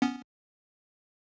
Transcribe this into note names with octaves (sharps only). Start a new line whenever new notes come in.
B3 C#4